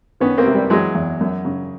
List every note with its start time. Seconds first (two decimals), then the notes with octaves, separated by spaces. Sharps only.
0.20 D#3 B3 C#4
0.38 A#3 C4
0.46 C3
0.54 G3
0.70 E3 F#3 G#3
0.95 E2
1.21 F#2
1.45 C#3